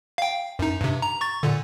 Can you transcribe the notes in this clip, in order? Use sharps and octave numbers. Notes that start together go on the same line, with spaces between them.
F5 G5
F#2 D#4
G2 C3
A#5
C#6 A6
A#2 D3